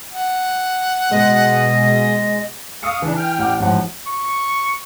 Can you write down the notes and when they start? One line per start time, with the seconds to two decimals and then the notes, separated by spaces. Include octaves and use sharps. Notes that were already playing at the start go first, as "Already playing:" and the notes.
0.12 F#5
1.11 B2 G#3 D#5
2.83 F5 C#6 D#6 E6 C#7
3.02 C#3 E3 D4
3.17 G5 F6
3.39 A1 F#5 D6
3.60 A1 G#2 F3 F#5
4.07 C#6